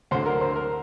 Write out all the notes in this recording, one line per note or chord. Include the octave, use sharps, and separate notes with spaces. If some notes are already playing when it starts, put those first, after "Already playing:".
D2 D3 C5
A#4
C5
A#4